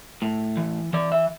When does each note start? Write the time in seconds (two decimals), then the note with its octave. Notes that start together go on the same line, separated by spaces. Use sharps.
0.22 A2
0.57 E3
0.93 E3 D5
1.12 E5